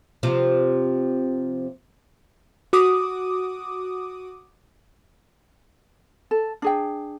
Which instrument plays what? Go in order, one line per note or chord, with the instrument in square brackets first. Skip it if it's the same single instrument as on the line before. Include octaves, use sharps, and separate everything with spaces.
[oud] C3 F3
[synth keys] F#4 D6 D#6
[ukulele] A4
D4 G#4 G5